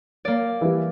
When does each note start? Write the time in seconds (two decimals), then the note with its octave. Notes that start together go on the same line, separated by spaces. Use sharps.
0.25 A#3 D5
0.61 E3 G3